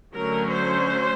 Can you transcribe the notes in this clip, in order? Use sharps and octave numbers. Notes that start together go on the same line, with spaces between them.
D3 F#3 A3 C#4 A#4
C5